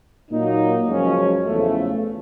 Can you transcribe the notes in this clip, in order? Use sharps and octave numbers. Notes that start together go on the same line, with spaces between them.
A#2 F#3 A#3 D#4
F#2 C#3 F3 G#3 C#4
E2 C#3 F3 A3